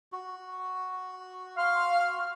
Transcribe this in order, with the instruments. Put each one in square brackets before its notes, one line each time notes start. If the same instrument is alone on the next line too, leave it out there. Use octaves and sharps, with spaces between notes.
[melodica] F#4
[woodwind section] F5 C6 F6